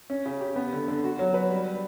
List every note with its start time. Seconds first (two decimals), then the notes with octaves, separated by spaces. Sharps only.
0.10 C#4
0.26 C#3
0.41 G4
0.56 B3
0.73 D3
0.88 D3
1.04 F#4
1.19 F#3
1.34 B4
1.50 G3